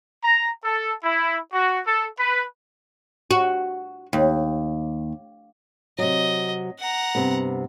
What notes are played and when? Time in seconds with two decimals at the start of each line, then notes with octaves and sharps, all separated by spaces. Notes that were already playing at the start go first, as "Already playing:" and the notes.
0.24 A#5
0.64 A4
1.04 E4
1.53 F#4
1.86 A4
2.19 B4
3.31 F#4
4.13 D#2
5.98 C3 F#3 D#5
6.79 F#5 A#5
7.15 G2 C3 B3